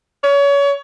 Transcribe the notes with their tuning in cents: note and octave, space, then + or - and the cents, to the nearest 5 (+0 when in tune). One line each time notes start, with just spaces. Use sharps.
C#5 +30